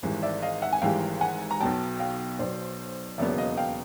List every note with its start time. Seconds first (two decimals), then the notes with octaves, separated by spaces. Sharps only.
0.03 G#1 G#2 E3 G3
0.23 D5 E5
0.42 D#5 F5
0.62 E5 F#5
0.72 G#5
0.81 G#1 G#2 E3 G3 F5 G5
1.21 F#5 G#5
1.51 A#5
1.60 B1 B2 F#3 G5 A5
2.00 F5 G5
2.39 B1 B2 F#3 C5 D5
3.18 E1 D#2 C#3 F#3 B3 D5 E5
3.38 D#5 F5
3.57 F5 G5